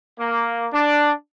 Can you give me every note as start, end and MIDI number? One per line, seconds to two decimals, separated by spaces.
0.19 0.65 58
0.72 1.12 62